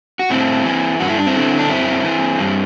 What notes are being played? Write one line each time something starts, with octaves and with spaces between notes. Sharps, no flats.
F#4
A2 C4 E4
E3
G2 F#4
E4
D4
C4 E4
D3
D4
F#2 C4 E4
E3
G2